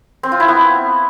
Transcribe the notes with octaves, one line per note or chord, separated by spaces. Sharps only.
C4
F4
E4
B3